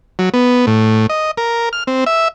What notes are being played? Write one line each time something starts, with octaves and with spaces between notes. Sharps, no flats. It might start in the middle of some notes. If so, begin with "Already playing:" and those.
F#3
B3
A2
D#5
A#4
F6
C4
E5